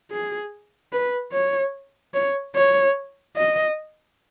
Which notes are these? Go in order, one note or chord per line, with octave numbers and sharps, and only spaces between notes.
G#4
B4
C#5
C#5
C#5
D#5